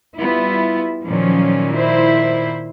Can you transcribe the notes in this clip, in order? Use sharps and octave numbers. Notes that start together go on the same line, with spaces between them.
G3 B3 E4 F4
A#2 D#3 F3 F#3 C#4
E4 C5